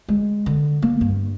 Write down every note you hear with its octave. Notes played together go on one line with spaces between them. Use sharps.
G#3
D3
A#3
G2